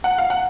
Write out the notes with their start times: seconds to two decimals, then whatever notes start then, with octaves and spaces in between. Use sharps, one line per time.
0.04 F#5
0.18 F5
0.30 F#5